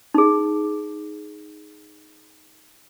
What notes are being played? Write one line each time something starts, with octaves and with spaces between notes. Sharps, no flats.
D#4 G#4